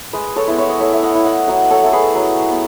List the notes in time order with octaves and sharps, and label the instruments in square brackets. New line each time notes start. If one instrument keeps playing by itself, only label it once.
[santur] G#3 B4 D#5
A4 C#5
B3 E4
C#5 E5
D#5
A3 C#5 E5
E5
D#5 F#5
E4
D#5 F#5
F#3 D#5 F#5
A4 C#5
A3 E4 A4
G#4 B4
F#3
B3